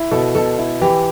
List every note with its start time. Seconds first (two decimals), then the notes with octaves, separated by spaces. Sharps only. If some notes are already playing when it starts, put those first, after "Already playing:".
Already playing: E4
0.11 B2 A4
0.35 B2 A4
0.58 E4
0.81 E3 G4